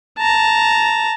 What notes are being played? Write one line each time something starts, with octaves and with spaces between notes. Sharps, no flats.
A5 A#5